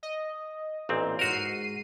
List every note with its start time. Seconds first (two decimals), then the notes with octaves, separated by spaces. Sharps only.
0.03 D#5
0.89 A1 A#2 C4
1.19 G#2 F#4 A#4 C7 D#7